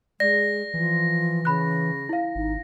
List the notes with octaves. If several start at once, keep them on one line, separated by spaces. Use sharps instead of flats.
G#3 D5 A#6
E3 F3
C#3 B5 F#6
E4 F5
G#1 D#4